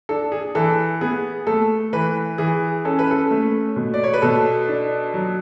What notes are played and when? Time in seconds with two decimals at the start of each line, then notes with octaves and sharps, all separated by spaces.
0.09 D4 A4
0.32 G#4
0.55 E3 A4
1.01 B3 G#4
1.47 A3 A4
1.93 E3 B4
2.38 E3 G#4
2.85 C#4 A4
2.99 B4
3.11 A4
3.31 A3
3.76 B2
3.94 D5
4.04 C#5
4.14 B4
4.22 B2 A4
4.68 D4
5.14 F#3